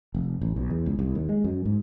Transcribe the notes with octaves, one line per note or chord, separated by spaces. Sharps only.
F1
A1
B1
E2
C#2
C2
D#2
G#3
F#2
G#2